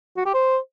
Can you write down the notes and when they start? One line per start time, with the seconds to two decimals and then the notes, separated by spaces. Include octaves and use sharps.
0.17 F#4
0.25 G4
0.34 C5